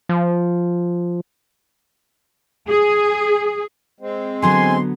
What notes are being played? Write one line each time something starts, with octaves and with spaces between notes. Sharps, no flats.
F3
G#4
G#3 C4
D3 F#3 B3 G#5 C6